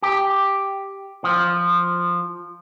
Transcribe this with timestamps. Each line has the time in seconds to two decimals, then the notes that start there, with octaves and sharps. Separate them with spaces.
0.02 G4
1.24 F3